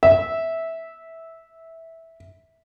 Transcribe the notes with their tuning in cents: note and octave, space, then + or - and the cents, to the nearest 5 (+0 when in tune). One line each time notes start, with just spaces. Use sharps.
E5 -10